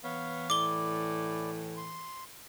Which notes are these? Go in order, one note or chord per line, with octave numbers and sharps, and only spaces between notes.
E3 B3 C#5 F5
A2 D5 D6 G7
C6